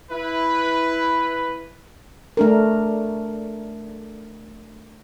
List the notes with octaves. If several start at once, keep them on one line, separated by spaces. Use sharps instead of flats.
E4 B4
A3 D4 A#4